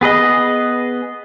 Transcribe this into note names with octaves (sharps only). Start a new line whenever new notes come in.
B3 G#4 B4 D#5